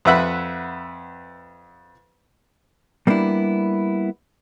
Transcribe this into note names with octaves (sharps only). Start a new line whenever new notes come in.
F2 B4 E5 F#5 B5
G3 A#3 B3 D4 E4